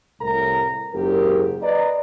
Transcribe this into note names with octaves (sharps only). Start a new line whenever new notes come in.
C2 A2 A#4 A#5
F#1 G#2 C#3 G4 A#4
B4 D5 D#5 A#5